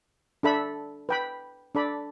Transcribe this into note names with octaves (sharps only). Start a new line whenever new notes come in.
D4 A4 E5 B5
B4 G5 B5
D4 A4 D5 B5